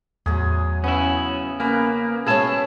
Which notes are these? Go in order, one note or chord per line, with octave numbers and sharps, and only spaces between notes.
E2 A2 F#3 G#4
C#3 B3 C#4 E4
C#3 A#3 B4 G#5
B2 G#3 E4 G#4 C#5 A5